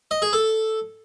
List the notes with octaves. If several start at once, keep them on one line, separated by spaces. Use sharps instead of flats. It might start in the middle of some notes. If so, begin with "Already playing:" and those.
D#5
G#4
A4